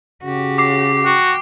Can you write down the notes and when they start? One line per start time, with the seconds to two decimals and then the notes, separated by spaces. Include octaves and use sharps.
0.23 C#3 F#4 G4
0.58 D6 C7
1.05 F#4 G5